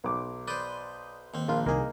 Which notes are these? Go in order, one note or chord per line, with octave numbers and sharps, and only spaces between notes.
B1 D6
B4 C5 D5 D#6 G6
D#2 C4
A#1 A#3 F4
C2 A#3 D#4 G#4